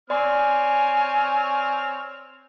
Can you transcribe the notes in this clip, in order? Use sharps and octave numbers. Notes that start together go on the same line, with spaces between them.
C4 C#5 D5 G#5 C6 F6